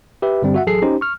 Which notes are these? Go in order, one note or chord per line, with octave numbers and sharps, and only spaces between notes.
G4 B4 E5
G2 D3 G3 C4
F#4 E5 F#5
A1 F#3 G#4 A4 C7
C#4 D#4 G4 C5
C#6 F6